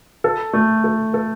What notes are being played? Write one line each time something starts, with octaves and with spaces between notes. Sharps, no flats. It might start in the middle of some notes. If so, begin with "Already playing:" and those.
A4
A3
A4
A4